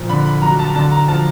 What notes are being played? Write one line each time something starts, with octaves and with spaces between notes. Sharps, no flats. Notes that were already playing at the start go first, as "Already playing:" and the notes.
Already playing: A#2 F3
D3 B5
B5
F#3 A#5
A5
D3 A5
A#5
F3 A5